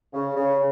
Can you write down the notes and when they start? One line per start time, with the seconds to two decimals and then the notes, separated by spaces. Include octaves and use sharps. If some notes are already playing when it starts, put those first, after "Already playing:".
0.13 C#3
0.36 C#3